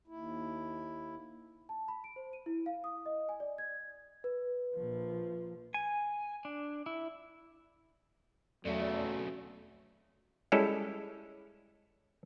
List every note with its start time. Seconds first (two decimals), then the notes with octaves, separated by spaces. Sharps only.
0.08 D#2 E4
1.69 A5
1.88 B5
2.04 D7
2.16 C5
2.33 D#7
2.46 E4
2.66 F5
2.84 D#6
3.06 D#5
3.29 G#5
3.40 D5
3.58 G#6
4.24 B4
4.75 A#1 F3
5.74 G#5
6.45 D4
6.86 E4
8.65 B1 E2 C#3 F#3 A3 D5
10.52 G3 G#3 C#4 E4 A4